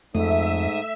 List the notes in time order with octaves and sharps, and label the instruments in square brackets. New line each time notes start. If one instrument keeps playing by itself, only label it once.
[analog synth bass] F2 [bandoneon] G#2 D#6 [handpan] A3 [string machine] E5